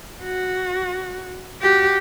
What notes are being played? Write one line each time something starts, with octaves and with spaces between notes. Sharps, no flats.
F#4
F#4 G4